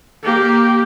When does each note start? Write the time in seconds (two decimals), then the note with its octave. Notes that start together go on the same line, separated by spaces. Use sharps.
0.23 A#3 G4